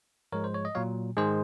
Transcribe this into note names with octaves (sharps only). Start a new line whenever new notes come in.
G#2 F3 G#3 A#4 C#5
C5
C#5
D#5
A#2 F#3 C#5 F5
G#2 D#3 G#3 G#4 C5